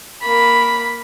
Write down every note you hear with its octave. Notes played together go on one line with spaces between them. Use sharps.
A#3 B5